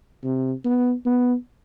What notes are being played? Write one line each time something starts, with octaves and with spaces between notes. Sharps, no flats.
C3
B3
B3